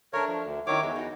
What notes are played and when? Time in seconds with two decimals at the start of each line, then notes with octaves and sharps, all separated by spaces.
0.13 A3 D4 A#4 C#5
0.28 F3
0.44 D2
0.67 D#3 F#3 C#4 E4 C#5 D6
0.83 E2 G#3
0.96 D#4 F#4